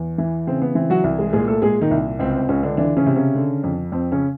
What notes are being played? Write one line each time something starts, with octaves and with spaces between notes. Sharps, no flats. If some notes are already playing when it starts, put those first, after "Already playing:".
Already playing: E2
E3
C#3 C4
B3
E3 C4
F#3 F#4
C2
G#3 G#4
A#2 G#3 G#4
A3 A4
A#2 G#3 G#4
D#3 D#4
C2
C#2 C4
C4
C#2 C#3 C#4
D3 D4
D3 E3 D4
C#3 C#4
C3
C#3 C#4
D3
F2
F2 C4
C#3 C#4